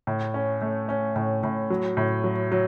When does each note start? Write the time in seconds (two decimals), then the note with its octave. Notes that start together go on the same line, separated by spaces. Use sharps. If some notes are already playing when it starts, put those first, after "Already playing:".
0.07 A2
0.34 C#4
0.62 A3
0.89 C#4
1.16 A2
1.43 A2
1.70 F#3
1.97 A2
2.24 F#3
2.52 F#3